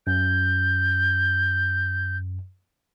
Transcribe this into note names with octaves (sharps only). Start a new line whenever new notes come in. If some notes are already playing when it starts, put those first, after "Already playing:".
F#2 G6